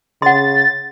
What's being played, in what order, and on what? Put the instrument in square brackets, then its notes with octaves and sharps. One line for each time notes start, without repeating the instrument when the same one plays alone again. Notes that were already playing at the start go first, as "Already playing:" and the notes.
[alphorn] C#3 [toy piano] F#5 C6 [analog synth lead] A6